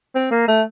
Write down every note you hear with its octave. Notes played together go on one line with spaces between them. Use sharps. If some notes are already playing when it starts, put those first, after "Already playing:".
C4
A#3
A3